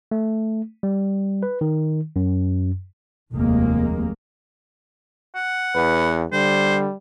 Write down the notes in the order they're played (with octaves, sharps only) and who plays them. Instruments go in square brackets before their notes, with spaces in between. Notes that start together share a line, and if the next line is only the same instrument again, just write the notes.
[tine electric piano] A3
G3
B4
D#3
F#2
[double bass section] F1 D#2 G#3 A#3
[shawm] F#5
[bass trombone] E2 [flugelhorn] B4
[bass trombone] D3 [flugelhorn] G3 [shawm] C5